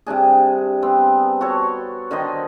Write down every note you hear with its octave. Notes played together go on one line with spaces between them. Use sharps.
C3 G3 D4 G#4
B3 C4
F#4 A4 C#5
D3 D#3 C5 D#5